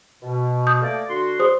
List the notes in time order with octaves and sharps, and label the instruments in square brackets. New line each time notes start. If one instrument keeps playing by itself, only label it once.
[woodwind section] B2
[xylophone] D#6 G6
[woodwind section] A3 A#3 D5
D3 F#4 C6
[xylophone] G#4 C5 D#6